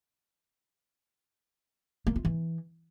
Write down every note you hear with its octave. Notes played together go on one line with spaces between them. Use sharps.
A#3
F4
E3